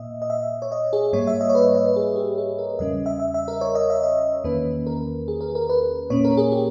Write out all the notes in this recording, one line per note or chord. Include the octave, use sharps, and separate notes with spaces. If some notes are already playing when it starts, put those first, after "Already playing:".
Already playing: A#2 A#3 D#5 E5
D#5
E5
C#5
D#5
G#4
G#2 G3 A#3 C#5
E5
D#5
C#5
B4
D#5
B4
G#4
G4
G#4
A#4
E2 C#3 G3 C#4 D#5
E5
E5
E5
A#4
C#5
D#5
E5
D#5
E2 D#3 A#3 C#4 B4
A#4
G#4
A#4
A#4
B4
A#2 A#3 C#4 C#5
A#4
G#4
G4